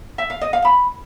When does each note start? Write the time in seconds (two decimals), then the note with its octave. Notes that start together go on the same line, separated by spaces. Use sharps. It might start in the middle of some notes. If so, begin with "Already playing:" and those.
0.18 E5
0.30 F5
0.41 D#5
0.53 F5
0.65 B5